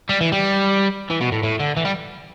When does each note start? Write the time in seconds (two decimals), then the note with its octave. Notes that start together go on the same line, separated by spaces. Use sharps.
0.09 G3
0.21 E3
0.32 G3
1.10 E3
1.21 B2
1.32 A2
1.44 A2
1.60 D3
1.77 E3
1.85 G3